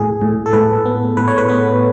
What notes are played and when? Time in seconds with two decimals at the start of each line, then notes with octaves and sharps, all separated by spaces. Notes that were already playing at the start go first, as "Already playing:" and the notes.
Already playing: A2 G#4
0.21 A2
0.46 A4
0.53 A2 B4
0.85 B3
1.17 A2 B4
1.28 C#5
1.38 B4
1.48 B3 B4